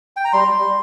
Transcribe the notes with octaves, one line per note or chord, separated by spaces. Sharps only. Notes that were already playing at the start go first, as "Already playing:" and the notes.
G5
A#5
G3 C6
G3
G3